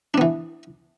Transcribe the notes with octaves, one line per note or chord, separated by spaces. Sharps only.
E3 B3 D4